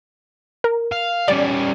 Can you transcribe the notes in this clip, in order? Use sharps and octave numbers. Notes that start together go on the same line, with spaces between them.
A#4
F5
G3 C#4 D5